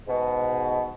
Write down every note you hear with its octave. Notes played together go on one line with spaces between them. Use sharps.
G#2 B2